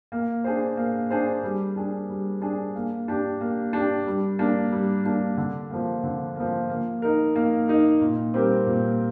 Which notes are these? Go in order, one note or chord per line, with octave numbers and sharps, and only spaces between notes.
A#3
D4 G#4 C5
A#3
D4 G#4 C5
G3
D4 G#4
G3
D4 G#4
A#3
D4 G4
A#3
D4 G4
G3
A#3 D4
G3
A#3 D4
D3
F3 A#3
D3
F3 A#3
A#3
D#4 A#4
A#3
D#4 A#4
A#2
G3 C4 G4 A#4
A#2